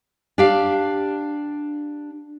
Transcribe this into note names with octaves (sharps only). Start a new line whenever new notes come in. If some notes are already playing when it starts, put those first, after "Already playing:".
D4 G4 F5